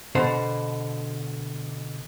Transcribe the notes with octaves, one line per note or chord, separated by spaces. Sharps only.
B2 D3 C5